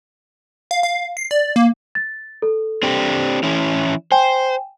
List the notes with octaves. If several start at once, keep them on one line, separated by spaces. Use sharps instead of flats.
F5
F5
C7
D5
A#3
A6
A4
C4 D4 G4
E3 C#4 E4
C5 G5 G#5